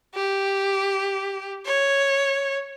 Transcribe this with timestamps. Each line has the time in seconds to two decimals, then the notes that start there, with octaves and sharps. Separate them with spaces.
0.15 G4
1.66 C#5